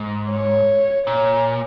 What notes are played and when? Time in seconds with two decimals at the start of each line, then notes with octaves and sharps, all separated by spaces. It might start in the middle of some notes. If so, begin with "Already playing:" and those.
Already playing: G#2
0.30 C#5
1.07 A#2 C#5